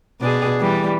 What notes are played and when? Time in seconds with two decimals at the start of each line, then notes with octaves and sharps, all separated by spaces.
0.21 B2 D4 G#4
0.60 E3 G3